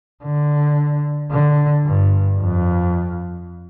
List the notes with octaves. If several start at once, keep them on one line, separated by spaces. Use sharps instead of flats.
D3
D3
G2
F2